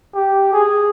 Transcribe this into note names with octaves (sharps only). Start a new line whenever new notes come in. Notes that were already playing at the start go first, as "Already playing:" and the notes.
G4
G#4